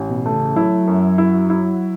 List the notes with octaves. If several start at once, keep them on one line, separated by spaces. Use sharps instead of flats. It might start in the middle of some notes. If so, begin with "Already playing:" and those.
Already playing: A1
B2
A3
C#3
F#3 E4
F#2
E4
E4